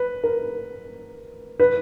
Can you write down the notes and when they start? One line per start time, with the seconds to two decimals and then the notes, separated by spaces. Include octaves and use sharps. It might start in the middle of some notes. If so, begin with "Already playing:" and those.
Already playing: B4
0.24 A#4
1.60 B4